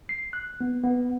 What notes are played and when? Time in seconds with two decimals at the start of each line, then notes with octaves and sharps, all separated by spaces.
0.09 C7
0.33 F#6
0.61 B3
0.84 B3